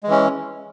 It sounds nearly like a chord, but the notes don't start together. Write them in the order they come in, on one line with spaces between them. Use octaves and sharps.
G#3 E3 C#4